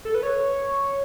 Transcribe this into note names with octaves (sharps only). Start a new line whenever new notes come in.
A4
B4
C#5